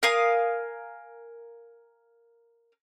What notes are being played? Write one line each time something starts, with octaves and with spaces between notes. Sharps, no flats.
A#4 F5 G#5 D#6